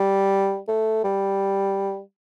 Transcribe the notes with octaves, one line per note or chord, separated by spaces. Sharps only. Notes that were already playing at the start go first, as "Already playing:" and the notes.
Already playing: G3
A3
G3